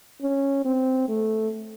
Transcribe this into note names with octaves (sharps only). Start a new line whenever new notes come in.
C#4
C4
A3